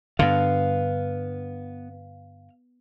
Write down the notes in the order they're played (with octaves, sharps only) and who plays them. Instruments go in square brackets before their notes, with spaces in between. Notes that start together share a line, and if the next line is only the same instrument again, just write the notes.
[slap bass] G2 D3 [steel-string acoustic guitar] B3 [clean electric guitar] F5